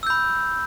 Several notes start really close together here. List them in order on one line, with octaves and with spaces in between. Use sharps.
E6 G6 B5